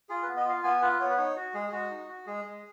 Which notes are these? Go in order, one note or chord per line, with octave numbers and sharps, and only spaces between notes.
F4 G#4
B4
B3
D#5
F4 F5
B3 G#5
F4 B4
B3 C#5
B4
D#4 C#5
F#4
G#3 G#4
G#4
G#3 F#4
D#4
F#4
G#3 G#4
G#3